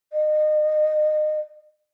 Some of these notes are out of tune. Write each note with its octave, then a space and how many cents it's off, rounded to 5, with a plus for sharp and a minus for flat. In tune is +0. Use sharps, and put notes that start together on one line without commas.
D#5 -30